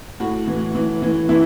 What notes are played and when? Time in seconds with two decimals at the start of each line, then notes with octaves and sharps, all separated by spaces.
0.20 A2 F#4
0.47 E3
0.75 E3
1.02 E3
1.29 E3 E4